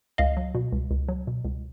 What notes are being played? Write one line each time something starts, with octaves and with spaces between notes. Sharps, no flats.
C#2 D#5 F5
F#3
B2
C#2
C#2
F#3
B2
C#2